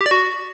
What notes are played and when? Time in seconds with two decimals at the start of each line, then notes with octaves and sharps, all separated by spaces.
0.01 G4
0.06 D5
0.11 F#4